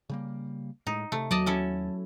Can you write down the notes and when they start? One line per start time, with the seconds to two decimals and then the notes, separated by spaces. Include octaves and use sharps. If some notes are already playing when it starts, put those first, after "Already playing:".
0.10 C#3 G3 A#3
0.87 A2 G#3 D#4
1.12 C3 A3
1.31 D#2 F#3 D5 D#5 A5
1.46 C#4 E4 A4